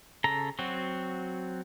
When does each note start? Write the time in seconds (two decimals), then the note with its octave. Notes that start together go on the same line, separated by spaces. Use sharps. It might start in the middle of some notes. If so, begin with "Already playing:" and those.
0.24 C#3 A4 A#5
0.59 F#3 C4 F#4